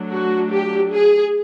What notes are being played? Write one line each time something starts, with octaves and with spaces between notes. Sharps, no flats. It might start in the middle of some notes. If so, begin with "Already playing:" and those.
Already playing: F#3 A3 D4
F#4
G4
G#4